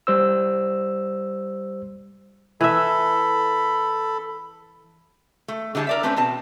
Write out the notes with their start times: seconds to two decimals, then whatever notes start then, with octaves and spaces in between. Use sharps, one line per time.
0.07 G3 C5 E6
2.61 E3 A4 E5 B5
5.48 A3
5.75 D3 G3 D4 G#4 A5
5.87 A#4 D5 E5
6.03 A3 C4 C#4 B4 C5
6.17 B2 C4 A5